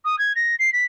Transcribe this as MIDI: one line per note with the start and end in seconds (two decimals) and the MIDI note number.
0.04 0.18 87
0.18 0.32 92
0.35 0.55 94
0.59 0.72 96
0.72 0.84 95